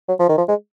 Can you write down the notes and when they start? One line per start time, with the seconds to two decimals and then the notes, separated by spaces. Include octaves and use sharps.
0.08 F#3
0.19 F3
0.29 D#3
0.38 F3
0.48 G#3